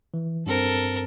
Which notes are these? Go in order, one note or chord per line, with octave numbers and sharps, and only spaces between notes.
E3
G2 C4 A4 A#4 C5